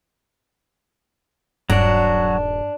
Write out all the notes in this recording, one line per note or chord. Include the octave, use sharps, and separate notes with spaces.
D#1 G2 F#3 D4 F#4